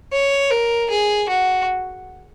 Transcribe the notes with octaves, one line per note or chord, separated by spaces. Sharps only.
C#5
A#4
G#4
F#4